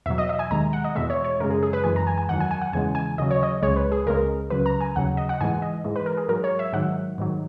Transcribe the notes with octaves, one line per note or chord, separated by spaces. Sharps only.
E2 B2 F#3 E5
D#5
E5
G#5
D#2 D#3 G#3 A#5
F#5
D#5
E2 B2 G#3 E5
C#5
C#5
F#2 C#3 G#3 A#4
G#4
G#4
B4
F#2 E3 G#3 G#5
A#5
G#5
G#5
E2 D#3 F#3 F#5
G#5
G#5
F#5
E2 C#3 E3 G#3 G#5
G#5
D#2 C#3 F#3 D#5
C#5
D#5
C#2 C#3 G#3 C#5
B4
G#4
C#2 C#3 G#3 A#4
C#2 C#3 F#3 B4
A#5
G#5
D#2 C#3 F#3 F#5
D#5
F#5
G#2 E3 G#3 G#5
D#5
G#2 E3 G#3
B4
A#4
G#4
G#2 F#3 A#4
C#5
E5
G#2 D#3 F#3 F#5
G#2 D#3 F#3